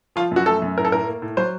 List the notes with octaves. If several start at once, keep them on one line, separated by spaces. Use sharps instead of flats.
F3 F4
F#2 F#4
A3 A4
F#2
A2 A#4
A4
A2 A#4
A#3
A2
F#3 C5